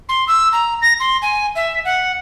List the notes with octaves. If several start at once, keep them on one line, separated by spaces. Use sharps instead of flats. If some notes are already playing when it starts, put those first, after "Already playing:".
C6
E6
A#5
A#6
C6
G#5
E5
F#5